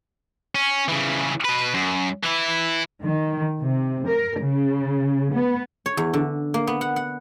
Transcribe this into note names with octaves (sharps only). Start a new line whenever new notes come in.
C#4
C#3 E3
B2 B4
F#2
E3 E4
D#3
C3
A#4
C#3
B3
C#5
E2
D3
A#3
B3
F#5
F#5